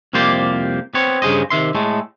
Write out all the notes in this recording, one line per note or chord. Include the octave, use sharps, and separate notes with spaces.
C2 F2 A#3 G4 C5 D5
B3 C4 C#5
G2 C#3 G#4 C5 D#5
C3 D#3 E5 C6
A2 G#3 A3